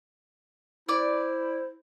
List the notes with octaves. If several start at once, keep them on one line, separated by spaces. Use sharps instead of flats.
E4 C5 D5 D6